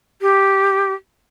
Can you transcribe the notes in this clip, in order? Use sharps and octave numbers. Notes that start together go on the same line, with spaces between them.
G4